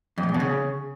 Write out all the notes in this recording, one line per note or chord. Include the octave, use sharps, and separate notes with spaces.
F2
A2
E2
B2
C#3